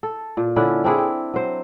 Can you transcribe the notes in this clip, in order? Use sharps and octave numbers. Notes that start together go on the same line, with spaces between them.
A4
A#2
D3 C#4 D4 E4
C4 D4 E4 G#4
G5
F#3 C5